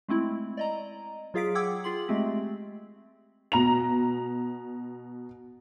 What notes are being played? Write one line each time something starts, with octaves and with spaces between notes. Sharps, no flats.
G#3 A3 C4 E4
D5 D#5 A#5
F#3 F4 G#4 F5 B6 D7
F#5 G5 D6 E6 G#6
F4 G#4 C6 F#7
G#3 A3 C4 G4
B2 A#5 F7